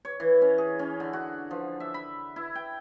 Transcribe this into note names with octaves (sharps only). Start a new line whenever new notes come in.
C#5
E3
C#4
G#4
C#4
D3
F#4
F3
E5
B5
E4
G5